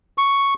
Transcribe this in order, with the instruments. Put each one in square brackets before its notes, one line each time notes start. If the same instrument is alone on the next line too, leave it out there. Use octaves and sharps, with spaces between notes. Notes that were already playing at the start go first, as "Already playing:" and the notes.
[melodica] C#6